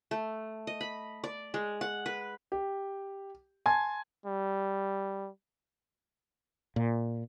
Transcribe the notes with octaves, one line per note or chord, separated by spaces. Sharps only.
A3
D#5
B5
D5
G#3
F#5
B4
G4
G#5 A5 C6 G#6
G3
A#2